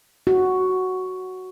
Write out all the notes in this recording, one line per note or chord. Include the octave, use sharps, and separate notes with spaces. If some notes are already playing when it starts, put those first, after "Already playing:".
F#4